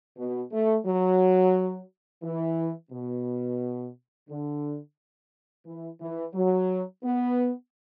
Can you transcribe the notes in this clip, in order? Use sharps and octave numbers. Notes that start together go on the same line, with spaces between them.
B2
A3
F#3
E3
B2
D3
E3
E3
F#3
B3